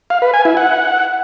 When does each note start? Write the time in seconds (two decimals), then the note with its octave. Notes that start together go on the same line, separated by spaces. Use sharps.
0.10 F5
0.22 B4
0.34 G#5
0.45 E4
0.57 F#5